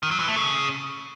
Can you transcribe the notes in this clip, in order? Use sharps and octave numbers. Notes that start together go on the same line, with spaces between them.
D#3
F#3
E3
A3
C#3